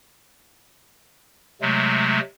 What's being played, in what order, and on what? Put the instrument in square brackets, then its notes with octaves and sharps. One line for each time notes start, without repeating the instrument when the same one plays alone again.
[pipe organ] C3 F#3 G#3 A3